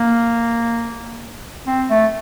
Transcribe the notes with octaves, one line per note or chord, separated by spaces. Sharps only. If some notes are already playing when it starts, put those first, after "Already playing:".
Already playing: A#3
C4
A3